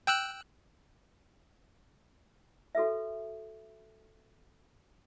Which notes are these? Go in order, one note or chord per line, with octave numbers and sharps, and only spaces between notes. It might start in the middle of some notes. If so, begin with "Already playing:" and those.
G5 E6 F#6
F#4 A4 B4 E5